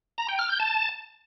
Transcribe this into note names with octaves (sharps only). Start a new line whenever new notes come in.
A#5
G5
F6
G6
A5